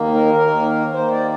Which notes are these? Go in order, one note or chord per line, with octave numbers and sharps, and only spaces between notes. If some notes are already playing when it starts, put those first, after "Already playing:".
Already playing: D#2 D#3 A#3
A#4
D#2 D#3 A#3
D#2 D#3 A#3 C5
D5